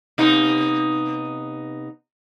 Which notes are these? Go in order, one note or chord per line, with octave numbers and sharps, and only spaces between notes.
C3 B3 D#4